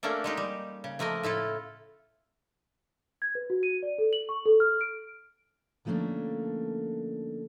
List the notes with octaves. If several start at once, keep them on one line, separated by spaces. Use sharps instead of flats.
A3 A#3 C#4 D4 A4
G#3 D#4 G4
G3
C#3
F3 A3 A#3 A#4 D#5
A2 E4 F4 A4
G#6
B4
F#4
D#7
D5
A4
F#7
C#6
A4
F6
D7
D3 F3 A3 A#3 C#4 D4